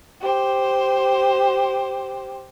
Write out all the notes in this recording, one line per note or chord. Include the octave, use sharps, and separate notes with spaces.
G4 C5